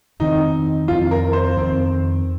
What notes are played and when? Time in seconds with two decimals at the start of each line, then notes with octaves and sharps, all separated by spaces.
0.19 F2 D#3 C4 D#4
0.88 F2 D#3 C4 F4
1.11 A#4
1.33 C5
1.56 F2 D#3 C4